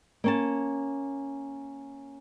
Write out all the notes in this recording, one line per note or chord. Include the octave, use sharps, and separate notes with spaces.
A#3 C#4 A5